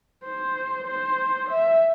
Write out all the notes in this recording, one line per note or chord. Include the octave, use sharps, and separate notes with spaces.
C5
C5
E5